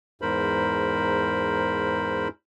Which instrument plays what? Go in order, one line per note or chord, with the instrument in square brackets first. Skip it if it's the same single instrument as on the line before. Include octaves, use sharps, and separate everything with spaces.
[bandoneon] E2 G#2 A#4 C5 B5